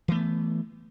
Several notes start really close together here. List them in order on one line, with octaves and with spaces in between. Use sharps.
E3 A3 B3